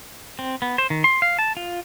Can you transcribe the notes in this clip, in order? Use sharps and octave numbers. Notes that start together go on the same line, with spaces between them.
C4
B3
C5
D#3
C6
F5
A5
F4